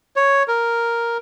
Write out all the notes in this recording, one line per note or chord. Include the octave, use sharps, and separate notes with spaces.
C#5
A#4